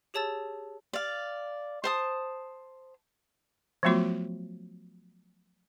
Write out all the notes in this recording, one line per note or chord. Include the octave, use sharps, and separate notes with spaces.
G4 G#4 C#5 A5 E6 A6
D5 F5
C5 A5 D#6
F3 F#3 A3 B3 F4 F#4